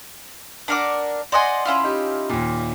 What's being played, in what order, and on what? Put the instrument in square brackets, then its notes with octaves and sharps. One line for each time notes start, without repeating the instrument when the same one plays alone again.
[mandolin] D4 A#4 D6 [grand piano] F#5
[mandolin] C5 D#5 G#5 [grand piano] D5 F#5 C6
[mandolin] C#4 E4 F4
[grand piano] D#4 G4
D#2 A#2